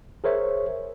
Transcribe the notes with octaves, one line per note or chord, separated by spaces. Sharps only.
G#4 A#4 C5 C#5 E5